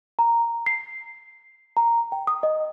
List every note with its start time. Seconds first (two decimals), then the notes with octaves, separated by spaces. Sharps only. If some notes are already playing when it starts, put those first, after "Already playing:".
0.19 A#5
0.66 C7
1.77 A#5
2.12 G5
2.27 D#6
2.43 D#5